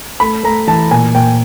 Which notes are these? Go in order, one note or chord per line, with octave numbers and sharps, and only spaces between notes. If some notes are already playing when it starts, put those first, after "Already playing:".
A3 B5
A3 A#5
E3 A5
A#2 G#5
A#2 G5